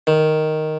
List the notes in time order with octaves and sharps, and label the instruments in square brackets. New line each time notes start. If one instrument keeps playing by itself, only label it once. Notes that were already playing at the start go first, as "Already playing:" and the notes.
[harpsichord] D#3